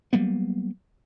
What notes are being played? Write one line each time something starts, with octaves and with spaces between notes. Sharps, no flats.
F#3 G3 A#3 B3